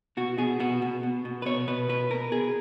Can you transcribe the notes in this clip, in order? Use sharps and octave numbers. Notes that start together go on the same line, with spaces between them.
B2 F#4
B2 G#4
B2 F#4
B2
B2
B2
B4
B2 C#5
B2 B4
B2 B4
B2 A#4
B2 G#4